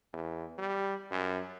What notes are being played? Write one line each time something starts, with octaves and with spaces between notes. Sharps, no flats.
E2
G3
F#2